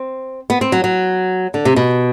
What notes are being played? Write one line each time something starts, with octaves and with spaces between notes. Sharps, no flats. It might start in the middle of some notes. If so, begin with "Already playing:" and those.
Already playing: C4
B3
C4
F#3
F#3
D3
C3
B2